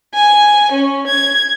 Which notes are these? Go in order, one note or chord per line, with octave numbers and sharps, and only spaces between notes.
G#5
C#4
G#6